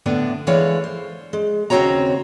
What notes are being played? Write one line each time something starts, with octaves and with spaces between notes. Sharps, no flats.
A2 D3 B3 D4
D3 E3 G#3 C#5 D5 F5
C5
G#3
D#2 C#3 C4 F#4 C#5 A#5